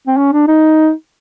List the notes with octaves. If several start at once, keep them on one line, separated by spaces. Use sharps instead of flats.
C4
C#4
D4
D#4